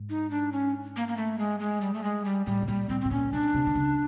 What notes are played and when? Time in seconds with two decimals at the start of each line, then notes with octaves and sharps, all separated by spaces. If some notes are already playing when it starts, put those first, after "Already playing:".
Already playing: G#2
0.10 D#4
0.31 D4
0.52 C#4
0.96 A#3
1.08 A#3
1.17 A3
1.38 G#3
1.60 G#3
1.81 G3
1.94 A3
2.04 G#3
2.25 G3
2.46 A2 G3
2.62 B2
2.68 A#2 G3
2.89 A#2 C4
3.01 A2 C4
3.11 A#2 C#4
3.33 B2 D4
3.54 C3
3.67 D3
3.75 C#3